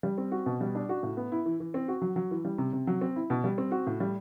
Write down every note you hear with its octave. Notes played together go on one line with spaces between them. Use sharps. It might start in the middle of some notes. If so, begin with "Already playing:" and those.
G3
C4
F#4
B2
G3
D4
F#4
A2
B3
E4
E3
E3
C4
F#4
F#3
F#3
E3
G3
C3
C3
F#3
C4
E4
B2
G3
C4
F#4
A2
G3